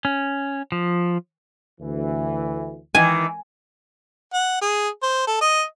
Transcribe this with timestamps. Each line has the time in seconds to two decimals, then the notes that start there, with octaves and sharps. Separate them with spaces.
0.05 C#4
0.72 F3
1.80 D2 E3
2.95 D#3 E3 G#5
4.33 F#5
4.61 G#4
5.03 C5
5.27 A4
5.41 D#5